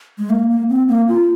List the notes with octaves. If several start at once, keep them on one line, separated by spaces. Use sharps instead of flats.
G#3
A#3
A#3
C4
A#3
F4